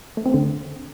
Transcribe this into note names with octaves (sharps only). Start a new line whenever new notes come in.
A3
C4
D3